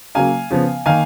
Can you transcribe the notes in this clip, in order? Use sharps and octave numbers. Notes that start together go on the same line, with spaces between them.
C#3 F#3 A#3 F5 G#5
C#3 F3 B3
D#3 A#3 F5 G#5